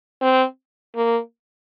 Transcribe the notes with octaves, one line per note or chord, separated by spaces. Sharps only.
C4
A#3